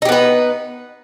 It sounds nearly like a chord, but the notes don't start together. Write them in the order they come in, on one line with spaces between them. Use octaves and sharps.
D#4 G4 B3 B4